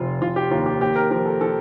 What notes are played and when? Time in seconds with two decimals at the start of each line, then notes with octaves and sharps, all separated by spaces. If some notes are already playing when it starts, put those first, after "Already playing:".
Already playing: F1 F3 F4
0.22 F1 F4
0.36 G4
0.51 D#2 F4
0.66 G4
0.81 D#2 G4
0.96 A#4
1.11 F3 A#4
1.26 A4
1.41 F3 A4